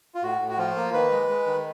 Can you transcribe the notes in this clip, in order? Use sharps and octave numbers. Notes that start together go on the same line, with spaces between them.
F4
A2 F#4
A2
F#4
F3 F4
A#3
D#3 B4
G#3
G#3
D#3